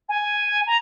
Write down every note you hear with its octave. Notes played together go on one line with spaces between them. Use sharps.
G#5
A#5